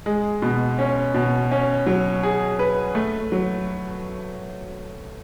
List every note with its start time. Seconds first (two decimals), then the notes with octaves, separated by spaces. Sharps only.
0.06 G#3
0.42 B2
0.79 C#4
1.14 B2
1.51 C#4
1.86 F#3
2.23 G#4
2.59 B4
2.95 A3
3.32 F#3